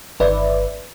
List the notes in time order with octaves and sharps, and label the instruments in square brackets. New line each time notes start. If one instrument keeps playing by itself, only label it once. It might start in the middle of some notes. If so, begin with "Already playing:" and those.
[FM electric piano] G1 D#3 B4 D5 E5